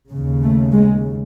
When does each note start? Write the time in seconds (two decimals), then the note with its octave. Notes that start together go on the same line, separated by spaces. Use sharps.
0.11 C#3
0.16 D#2
0.43 A3
0.74 G#3